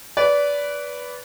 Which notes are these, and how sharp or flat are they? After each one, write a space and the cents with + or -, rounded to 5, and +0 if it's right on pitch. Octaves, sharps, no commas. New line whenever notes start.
B4 +0 D5 -20